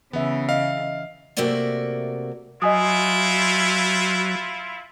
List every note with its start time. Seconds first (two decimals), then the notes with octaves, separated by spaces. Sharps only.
0.13 C#3 E3 B3 E5
0.49 D#5 F5
1.37 C3 A3 A#3 F#4 D5 E5
2.62 F#3 E4 F4 D#5 G#5 D#6